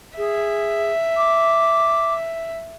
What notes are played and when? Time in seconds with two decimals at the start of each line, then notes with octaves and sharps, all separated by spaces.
0.18 G#4 E5
1.17 D6